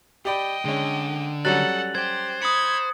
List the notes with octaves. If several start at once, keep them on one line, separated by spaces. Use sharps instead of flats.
G4 D5 D#5 G5 B5
D3 G#3 C#4
F#3 G3 C#4 A4 F#5 F#6 A6 F#7
G4 C5 G#6
B5 D#6 G#6 C#7